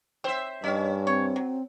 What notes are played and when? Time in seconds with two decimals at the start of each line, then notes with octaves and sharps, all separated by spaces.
0.24 C4 C5 E5
0.64 G2 D#3 A#3 C#4 D#5
1.07 C4 C#5
1.36 F#3